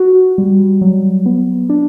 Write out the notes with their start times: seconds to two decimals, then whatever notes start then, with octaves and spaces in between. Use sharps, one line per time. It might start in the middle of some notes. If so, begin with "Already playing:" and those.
Already playing: F#4
0.38 G3
0.81 F#3
1.26 B3
1.69 D4